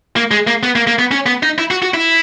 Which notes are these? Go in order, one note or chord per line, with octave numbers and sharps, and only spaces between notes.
A#3
G#3
A#3
B3
A#3
A#3
B3
C#4
B3
D#4
E4
F#4
F#4
E4